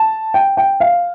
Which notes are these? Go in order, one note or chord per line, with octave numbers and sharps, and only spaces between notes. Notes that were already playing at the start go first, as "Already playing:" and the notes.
Already playing: A5
G5
G5
F5